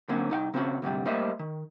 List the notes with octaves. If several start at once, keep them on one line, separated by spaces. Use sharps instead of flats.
D3 F#3 A#3 C4 C#4
C2 D#4 F#5 G5
C#3 C4 C#4 F#4
D2 G#2 C3 G3
G3 A3 A#3 C5 D#5 E5
D#3